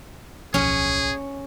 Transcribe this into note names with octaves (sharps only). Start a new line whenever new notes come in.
D1 B1 F3 C#4 G#4